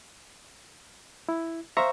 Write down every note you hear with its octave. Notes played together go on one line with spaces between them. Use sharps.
E4
C5 E5 F5 A#5 C#6